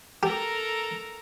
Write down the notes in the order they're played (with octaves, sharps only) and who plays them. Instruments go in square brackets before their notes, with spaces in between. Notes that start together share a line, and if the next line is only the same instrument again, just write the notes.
[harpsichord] G4 [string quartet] A4 A#4 A#5